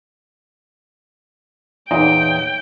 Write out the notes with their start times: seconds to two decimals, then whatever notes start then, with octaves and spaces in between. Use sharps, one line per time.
1.91 E2 A#2 D#4 C#5 D#5 G5